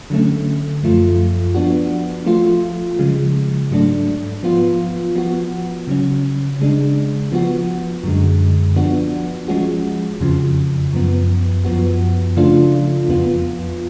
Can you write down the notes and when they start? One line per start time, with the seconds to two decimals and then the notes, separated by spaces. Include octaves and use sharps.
0.10 D3 F#3 A3 C#4
0.83 F#2 F3 A3 F4
1.55 F3 B3 D4 F#4
2.26 F3 A3 F4
2.99 C#3 F3 G#3
3.71 G#2 F#3 A3 D4
4.43 F3 B3 F4
5.16 F3 B3 F#4
5.87 C#3 F#3 C#4
6.59 C#3 G#3 D4
7.32 F3 B3 F#4
8.04 F#2 D3 G#3
8.76 F3 B3 D4 F#4
9.48 F3 G#3 C#4 F#4
10.21 F2 C#3 F3
10.93 F#2 F3 B3
11.65 F#2 F3 B3 F#4
12.37 C#3 F3 A3 D4 F4
13.09 F2 F3 B3 F4